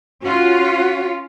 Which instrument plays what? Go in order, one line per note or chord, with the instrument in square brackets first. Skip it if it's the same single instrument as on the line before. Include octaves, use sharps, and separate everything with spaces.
[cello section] C#4 F4 [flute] F#4